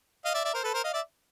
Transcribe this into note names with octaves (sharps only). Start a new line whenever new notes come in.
D#5 F5
D5 E5
D5 E5
A#4 C5
A4 B4
A#4 C5
D#5 F5
D5 E5